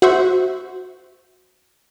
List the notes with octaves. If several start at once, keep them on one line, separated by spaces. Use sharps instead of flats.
F#4 C5 E5 C#6